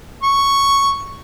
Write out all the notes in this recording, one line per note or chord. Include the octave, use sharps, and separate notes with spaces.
C#6